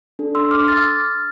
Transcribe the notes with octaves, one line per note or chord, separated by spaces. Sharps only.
D4 A4
C6 E6
D6 F6
F6 A6